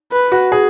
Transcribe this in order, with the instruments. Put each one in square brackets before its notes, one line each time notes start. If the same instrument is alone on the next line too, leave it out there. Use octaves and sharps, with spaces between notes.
[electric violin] B4
[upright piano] F#4
G#4